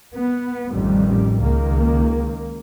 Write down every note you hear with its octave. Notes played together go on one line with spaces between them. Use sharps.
B3
A1 F2 D#3 G3
C#2 D#3 A#3